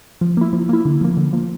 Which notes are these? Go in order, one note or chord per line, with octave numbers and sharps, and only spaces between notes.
F3
A#3 E4
F3
A#3 E4
D3
F3 A#3
D3
F3 A#3